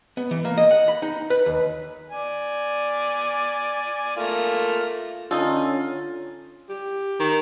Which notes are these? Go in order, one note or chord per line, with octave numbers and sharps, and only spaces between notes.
B3
E3
A#3
D#5
F#5
B5
D#4
B4
D#2
D5 G#5
A3 A#3 F4
D3 C#4 D#4 F4 A4
G4
D#3